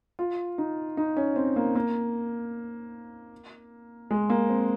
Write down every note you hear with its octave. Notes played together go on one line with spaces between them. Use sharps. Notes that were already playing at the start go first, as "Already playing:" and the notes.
F4
D#4
D#4
C#4
C4
A#3
A#3
G#3
A#3
C4